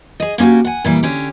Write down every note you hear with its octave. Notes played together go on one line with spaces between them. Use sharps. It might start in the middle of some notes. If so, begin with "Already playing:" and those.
G#4 D#5
A#3 C#4 D4 F#4 G4
F#5 G#5
A#2 E3 G3
D3 C#4 G4